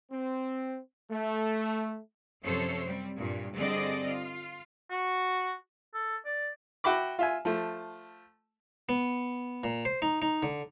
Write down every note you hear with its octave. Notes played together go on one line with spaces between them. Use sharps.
C4
A3
F#2 C3 F3 A4 C5 C#5
G3 C4
G2 A#2
D3 G3 C4 G#4 D5 D#5
F4
F#4
A4
D5
F#4 E5 G5 B5 D6
F4 E5 G#5
F3 A3
B3
A#2
C5
D#4
D#4
D3